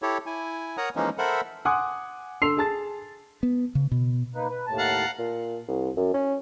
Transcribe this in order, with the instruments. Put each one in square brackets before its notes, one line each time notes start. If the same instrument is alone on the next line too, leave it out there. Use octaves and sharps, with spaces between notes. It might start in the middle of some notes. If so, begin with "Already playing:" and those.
[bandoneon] E4 G4 A4 C#5
E4 G#5
A#4 C#5 F#5 A#5 D#6 F#6
E3 F3 G#3 A#3 C#4 D#4
A4 A#4 C5 E5 F#5 B5
[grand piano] F#5 G#5 C6 D6 D#6 F#6
D3 A4 C6 E6 C7 F7
G#4 A5 A6
[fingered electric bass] B3
C#3
B2
[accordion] A#3 D#4 B4
B4
D#2 A2 A5
[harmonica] F5 F#5 A#5
[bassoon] A#2
C2
F#2
C#4